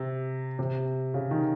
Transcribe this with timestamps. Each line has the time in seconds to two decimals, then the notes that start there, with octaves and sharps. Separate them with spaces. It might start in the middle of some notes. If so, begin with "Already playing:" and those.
Already playing: C3
0.59 C3
1.14 C#3
1.31 D#3